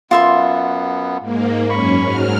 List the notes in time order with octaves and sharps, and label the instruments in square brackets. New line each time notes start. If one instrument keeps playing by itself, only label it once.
[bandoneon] F#2 B3 [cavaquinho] F4 E5 C6
[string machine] G#2 A#3
[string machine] F#2 C#4 [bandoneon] B5 C#6
[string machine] G#2 F#3 F6